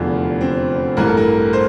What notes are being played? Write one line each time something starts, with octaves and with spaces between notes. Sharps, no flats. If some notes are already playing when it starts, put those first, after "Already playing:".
Already playing: F1 E2 D3 F3 D4
C4
A1 G2 E3 A#4
A4
A#4
C5